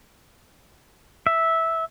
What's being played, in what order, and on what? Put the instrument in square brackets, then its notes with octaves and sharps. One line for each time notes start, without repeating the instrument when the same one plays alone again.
[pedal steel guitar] E5